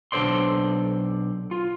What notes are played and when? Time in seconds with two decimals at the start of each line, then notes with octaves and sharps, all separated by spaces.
0.12 B1 D4 A4 C5 D5 C6
1.51 F4